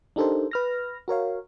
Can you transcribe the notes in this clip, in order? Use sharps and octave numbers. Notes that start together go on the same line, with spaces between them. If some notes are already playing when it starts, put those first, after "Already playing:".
D4 D#4 G4 A4 A#4 C5
B4 F6 A#6
F#4 A#4 C#5 F5